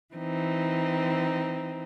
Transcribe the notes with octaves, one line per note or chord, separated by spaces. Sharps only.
E3 C4 D#4